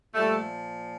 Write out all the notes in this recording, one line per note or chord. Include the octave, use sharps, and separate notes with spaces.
A#2 F3 G3 A3